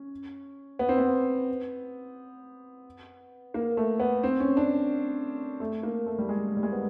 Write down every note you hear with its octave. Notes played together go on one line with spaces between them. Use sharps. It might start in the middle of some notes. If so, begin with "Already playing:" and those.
Already playing: C#4
B3
C4
B3
A#3
A3
B3
C4
C#4
D4
A3
A#3
A3
G3
G#3
G3
G#3
B3